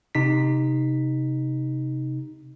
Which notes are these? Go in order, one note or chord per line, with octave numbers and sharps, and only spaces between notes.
C3 D#4 B6